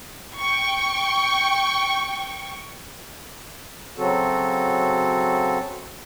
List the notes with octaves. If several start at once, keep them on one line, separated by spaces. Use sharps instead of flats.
G5 C#6
C#3 F#3 C4 F#4 A4